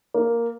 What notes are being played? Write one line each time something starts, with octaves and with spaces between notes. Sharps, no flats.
A#3